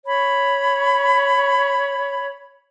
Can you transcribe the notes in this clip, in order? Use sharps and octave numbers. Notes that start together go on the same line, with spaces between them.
C#5 B5